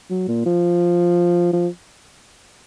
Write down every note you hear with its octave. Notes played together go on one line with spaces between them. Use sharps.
F#3
A#2
F3
F3